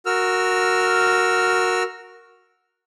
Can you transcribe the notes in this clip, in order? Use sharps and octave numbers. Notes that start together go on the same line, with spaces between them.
F#4 A#4 E6 F6